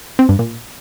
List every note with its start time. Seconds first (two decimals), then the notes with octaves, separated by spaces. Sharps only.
0.19 C4
0.29 G2
0.39 A#2